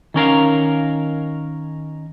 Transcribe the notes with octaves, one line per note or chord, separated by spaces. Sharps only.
D#3 C#4 A#4 F5